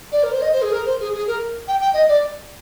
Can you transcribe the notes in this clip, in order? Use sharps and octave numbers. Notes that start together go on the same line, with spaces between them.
D5
A#4
C5
D#5
C5
G#4
A#4
C5
G#4
G#4
A#4
G5
G5
D#5
D5